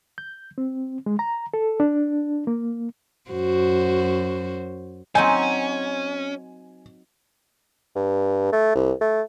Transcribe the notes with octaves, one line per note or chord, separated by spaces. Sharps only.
G6
C4
G#3
A#5
A4
D4
A#3
F#2 F#4 C5
F#3 C4 C#4 D#4 G#5
G2
A3
C2
A3